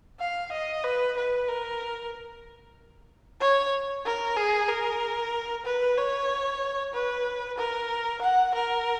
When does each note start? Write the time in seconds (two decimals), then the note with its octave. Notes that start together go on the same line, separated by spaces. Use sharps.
0.20 F5
0.52 D#5
0.84 B4
1.17 B4
1.49 A#4
3.40 C#5
4.05 A#4
4.36 G#4
4.68 A#4
5.65 B4
5.97 C#5
6.94 B4
7.58 A#4
8.21 F#5
8.54 A#4